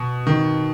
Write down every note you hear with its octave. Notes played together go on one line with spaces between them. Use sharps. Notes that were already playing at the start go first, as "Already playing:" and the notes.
Already playing: B2
D#3